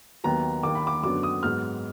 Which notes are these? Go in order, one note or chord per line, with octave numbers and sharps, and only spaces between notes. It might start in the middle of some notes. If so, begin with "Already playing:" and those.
D#2 D#3 F#3 B3 A#5
D#2 D#3 A#3 D6
B5
D6
F#2 D3 F#3 B3 D6
D#6
G#2 F#3 B3 F6